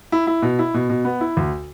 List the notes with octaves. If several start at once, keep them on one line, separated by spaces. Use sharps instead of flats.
E4
E4
B2
E4
B2
B2
B3
E4
D2